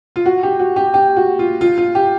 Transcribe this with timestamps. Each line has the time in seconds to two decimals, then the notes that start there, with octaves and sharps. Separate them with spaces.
0.16 F4
0.26 F#4
0.43 G4
0.59 F#4
0.76 G4
0.94 G4
1.16 F#4
1.39 F4
1.61 F4
1.78 F4
1.95 G4